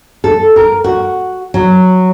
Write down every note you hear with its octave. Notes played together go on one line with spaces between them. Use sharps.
A4
A#4
F#4
F#3